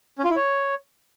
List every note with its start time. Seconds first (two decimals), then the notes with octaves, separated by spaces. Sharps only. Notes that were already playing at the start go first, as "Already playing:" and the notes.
0.18 C#4
0.24 F4
0.30 E4
0.36 C#5